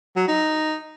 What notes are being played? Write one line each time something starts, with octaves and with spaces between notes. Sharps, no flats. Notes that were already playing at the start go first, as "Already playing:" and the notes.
F#3
D#4